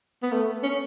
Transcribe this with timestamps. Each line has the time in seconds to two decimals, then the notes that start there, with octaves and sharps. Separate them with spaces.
0.23 B3
0.32 A3
0.63 C#4